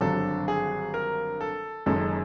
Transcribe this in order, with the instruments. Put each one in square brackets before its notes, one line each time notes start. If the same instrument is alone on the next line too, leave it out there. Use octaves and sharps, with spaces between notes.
[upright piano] G#1 G2 D3 F#3 [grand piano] A4
[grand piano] G#4
A#4
A4
[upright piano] F#1 F#2 D#3 G#3 [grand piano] A4